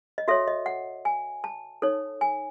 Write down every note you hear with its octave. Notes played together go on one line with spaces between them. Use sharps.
D#5
F#4 A4 C#5 E5
D#5
F#5
G#5
A5
D#4 A4 C#5
G#5